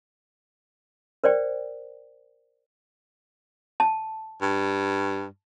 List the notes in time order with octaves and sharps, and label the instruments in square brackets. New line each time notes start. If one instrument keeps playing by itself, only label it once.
[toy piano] A#4 C5 D5 G5
A5
[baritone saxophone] G2